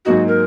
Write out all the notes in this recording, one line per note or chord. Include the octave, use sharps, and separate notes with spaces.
G#2 F#3 A#3 D#4 F#4
A#4